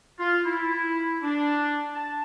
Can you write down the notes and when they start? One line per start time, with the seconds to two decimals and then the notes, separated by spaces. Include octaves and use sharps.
0.19 F4
0.45 E4
1.23 D4
1.94 A5